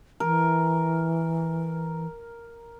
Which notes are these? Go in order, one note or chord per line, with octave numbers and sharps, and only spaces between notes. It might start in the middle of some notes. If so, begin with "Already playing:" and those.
E3 A#4